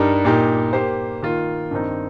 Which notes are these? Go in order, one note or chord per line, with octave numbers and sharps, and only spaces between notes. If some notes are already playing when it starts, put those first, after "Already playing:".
Already playing: G2 G3 D#4 A#4
A#2 A#3 D#4 G4
A#3 G4 C5
D#3 A#3 F4
G2 D#3 C4 D#4